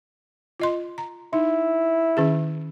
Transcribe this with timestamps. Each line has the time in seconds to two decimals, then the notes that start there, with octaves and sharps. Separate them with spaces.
0.60 F4 D#5 C6
0.98 A#5
1.33 D#4 E4
2.17 D#3 C#4 G#4